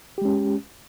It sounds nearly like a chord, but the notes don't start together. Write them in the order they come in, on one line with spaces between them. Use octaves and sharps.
G4 G#3 C#4